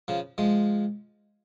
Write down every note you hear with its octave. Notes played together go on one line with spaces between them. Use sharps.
C#3 F3
F3 G#3